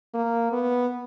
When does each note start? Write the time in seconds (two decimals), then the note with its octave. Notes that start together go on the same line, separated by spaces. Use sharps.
0.14 A#3
0.52 B3